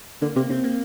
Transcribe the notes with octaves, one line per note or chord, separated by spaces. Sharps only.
D3 A#3
C3 A#3
C3 C4
A#3